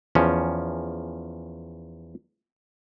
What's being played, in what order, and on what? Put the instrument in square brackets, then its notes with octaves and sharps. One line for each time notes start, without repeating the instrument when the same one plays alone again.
[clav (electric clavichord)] E2 F3 C#4